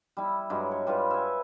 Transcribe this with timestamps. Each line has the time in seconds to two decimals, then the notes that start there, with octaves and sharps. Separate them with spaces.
0.17 G3 E4
0.50 G2 F#3 G#3
0.71 C#5
0.87 G3 F4 B4 C#5
1.11 E5 G#5